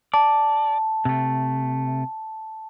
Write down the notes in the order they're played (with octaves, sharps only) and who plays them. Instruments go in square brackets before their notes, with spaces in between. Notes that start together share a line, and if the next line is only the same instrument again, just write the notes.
[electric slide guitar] D5 [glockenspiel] A5
[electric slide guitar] C3 A3